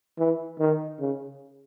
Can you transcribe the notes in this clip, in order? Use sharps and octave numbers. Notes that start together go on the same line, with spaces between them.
E3
D#3
C#3